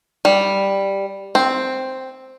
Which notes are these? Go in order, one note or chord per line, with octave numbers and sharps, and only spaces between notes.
G3
C4